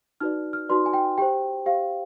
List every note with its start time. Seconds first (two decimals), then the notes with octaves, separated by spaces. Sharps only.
0.20 D#4 F#4 B4 D5 F6
0.53 F6
0.69 D#4 F#4 B4 D5 C6
0.86 G#5
0.93 G5
1.18 G4 C5 G5
1.66 G4 C5 F5